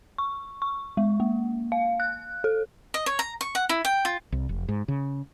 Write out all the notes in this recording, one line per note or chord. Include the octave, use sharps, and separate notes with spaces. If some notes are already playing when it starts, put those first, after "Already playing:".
C#6
C#6
G#3
A#3
F5
F#6
A4
D#5
C#5
A#5
C#6
F#5
E4
G5
F4
C2
F1
G#2
C#3